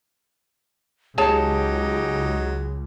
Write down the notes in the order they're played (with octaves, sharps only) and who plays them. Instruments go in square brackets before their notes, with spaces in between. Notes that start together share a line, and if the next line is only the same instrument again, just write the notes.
[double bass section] C#2 [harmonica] F#3 D#4 [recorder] G4 [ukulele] G#4 C#5 A5